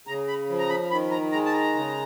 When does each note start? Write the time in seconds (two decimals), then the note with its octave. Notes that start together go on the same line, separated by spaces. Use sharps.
0.07 C#3 A#5
0.28 B5
0.49 F3
0.59 A#5
0.69 B5
0.91 D#3 B5
1.11 A#5
1.32 G#3 A#5
1.45 A5
1.53 A#5
1.75 C#3